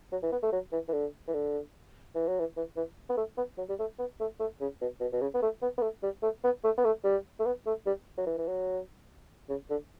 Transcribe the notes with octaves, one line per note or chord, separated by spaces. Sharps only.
F#3
E3
B3
A3
F#3
E3
E3
D3
E3
D3
E3
F#3
E3
E3
E3
B3
A3
B3
F#3
G3
A3
B3
A3
A3
C#3
B2
B2
B2
C#3
B3
A3
B3
B3
A3
G3
A3
B3
A3
B3
A3
G3
A3
B3
A3
G3
F#3
E3
E3
F#3
C#3
D3